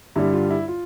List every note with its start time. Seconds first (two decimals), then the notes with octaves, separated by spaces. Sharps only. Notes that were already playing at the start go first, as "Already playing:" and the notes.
0.16 G2 D3 G3 E4
0.33 F4
0.50 E4
0.68 F4